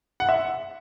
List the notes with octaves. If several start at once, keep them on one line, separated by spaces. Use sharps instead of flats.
F#5
E5